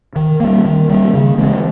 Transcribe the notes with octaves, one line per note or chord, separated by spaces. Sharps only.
D#3
G3 A#3
D#3
G3 A#3
C#3
E3 G#3 C4